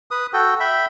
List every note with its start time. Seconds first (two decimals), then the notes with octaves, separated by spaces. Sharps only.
0.11 B4 D#6
0.33 F#4 A4 G5
0.60 E5 G5 B5